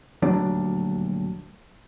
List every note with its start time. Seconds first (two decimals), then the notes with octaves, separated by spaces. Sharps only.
0.22 D#1 D2 F#3 D4